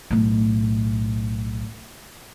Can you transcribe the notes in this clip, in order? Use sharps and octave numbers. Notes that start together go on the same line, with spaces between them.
B1 A2